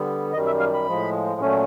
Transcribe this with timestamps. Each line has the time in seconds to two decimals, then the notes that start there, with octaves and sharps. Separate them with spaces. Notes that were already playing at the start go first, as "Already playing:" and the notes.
Already playing: D3 G3 B3
0.33 F#2 D#3 G3 D#5
0.47 E5
0.59 F5
0.74 B5
0.87 A2 F3 G#3
1.41 A#2 F#3 A3 C#4